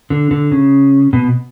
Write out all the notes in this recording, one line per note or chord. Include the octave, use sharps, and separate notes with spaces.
D3
D3
C#3
B2